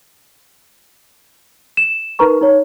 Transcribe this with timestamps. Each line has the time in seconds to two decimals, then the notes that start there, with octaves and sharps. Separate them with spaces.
1.77 E7
2.19 D#4 A#4 B4 A#5 C#6
2.41 D#4 C#5